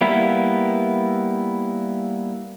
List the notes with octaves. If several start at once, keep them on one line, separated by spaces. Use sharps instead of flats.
G3 A#3 B3 E4